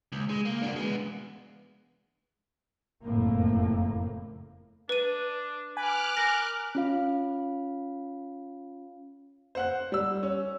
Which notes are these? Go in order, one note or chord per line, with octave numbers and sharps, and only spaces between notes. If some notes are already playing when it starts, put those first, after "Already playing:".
C#2
G#3
A#3
D4 F#4
G#3 B3
F#1 F2 A2 A#3
D4 B4 D#7
B4 G#5 D6 F6 F#6
A#4 A#6
C#4 F4 F5
C5 F#5 F#6
G3 E6
C#4